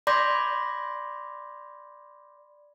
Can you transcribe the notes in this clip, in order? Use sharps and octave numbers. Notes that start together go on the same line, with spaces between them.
D5 B5 C6 D6 G6 A#6